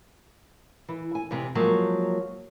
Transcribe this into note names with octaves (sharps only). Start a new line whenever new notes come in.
E3
G#5
E2 C3 C4
F3 F#3 G#3 A#3 F#4